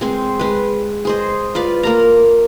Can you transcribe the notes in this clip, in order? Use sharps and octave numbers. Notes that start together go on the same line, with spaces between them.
G#3 C4 C5
G#3 B4
G#4 C5 D#5
F4 B4 D5
A#3 A#4 A#5